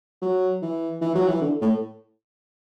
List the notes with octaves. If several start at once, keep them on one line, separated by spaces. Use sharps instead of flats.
F#3
E3
E3
F#3
E3
D3
A2